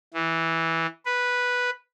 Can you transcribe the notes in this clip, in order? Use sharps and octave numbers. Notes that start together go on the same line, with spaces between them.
E3
B4